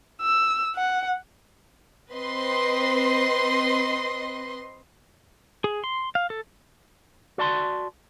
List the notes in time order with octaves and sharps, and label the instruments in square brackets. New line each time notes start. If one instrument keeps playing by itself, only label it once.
[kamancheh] E6
F#5
[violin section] C4 B4 D#5 C6
[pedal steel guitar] G#4
C6
F5
A4
[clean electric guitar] F#4 D5 A5 C6